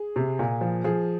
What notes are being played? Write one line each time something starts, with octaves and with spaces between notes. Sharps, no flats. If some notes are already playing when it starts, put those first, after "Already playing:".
Already playing: G#4
C3
A#2
F3
F3 G#4